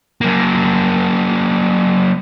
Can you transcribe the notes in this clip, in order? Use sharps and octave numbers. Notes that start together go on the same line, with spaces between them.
F#3 A#3